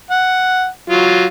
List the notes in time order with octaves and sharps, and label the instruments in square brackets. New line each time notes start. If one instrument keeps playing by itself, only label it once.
[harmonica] F#5
F#3 F4